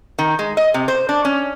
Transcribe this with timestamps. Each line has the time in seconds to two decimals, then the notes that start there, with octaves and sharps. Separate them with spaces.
0.19 D#3
0.39 G#3
0.57 D#5
0.74 C3
0.88 C5
1.09 D4
1.25 C#4